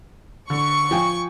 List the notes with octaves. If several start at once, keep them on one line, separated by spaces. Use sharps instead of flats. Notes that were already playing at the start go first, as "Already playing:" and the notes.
D3 C#6
F3 G5 G#5